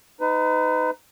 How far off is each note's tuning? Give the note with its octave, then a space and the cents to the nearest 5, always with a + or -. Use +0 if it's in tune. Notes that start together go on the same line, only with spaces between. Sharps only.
D#4 +5 B4 +40